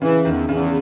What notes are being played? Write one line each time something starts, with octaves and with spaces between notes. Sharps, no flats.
C#3 E3
E2 D#3
E2 C#3